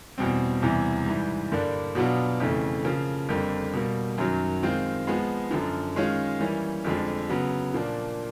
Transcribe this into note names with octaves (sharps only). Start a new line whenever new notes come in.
E2 B2 G3 C4
E2 C3 E3 G3
G#2 E3 G3
G2 D3 G3 A#3 D4
B2 F#3 B3 D4 F4
F2 C#3 E3 A3
C#3 F3 A#3
F2 D3 G3 A#3
B2 G3 A#3
F#2 D#3 F#3
D#3 G#3 C4 F4
F3 G#3 B3
F#2 D3 F3
D#3 G#3 C#4 F4
E3 G3 A#3 C#4
F2 D3 F3 G#3
C#3 F#3 B3
A#2 F3 A#3 D4